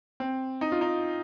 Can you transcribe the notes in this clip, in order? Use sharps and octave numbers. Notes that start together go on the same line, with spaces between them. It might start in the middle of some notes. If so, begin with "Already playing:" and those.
C4
D#4
F4
D#4